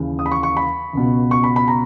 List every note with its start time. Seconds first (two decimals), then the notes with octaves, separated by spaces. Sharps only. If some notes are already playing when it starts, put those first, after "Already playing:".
Already playing: D#2 C#3 E3
0.19 D#6
0.26 B5
0.31 C#6
0.43 C#6
0.57 B5
0.93 C#2 B2
1.31 C#6
1.44 B5
1.56 B5
1.68 A#5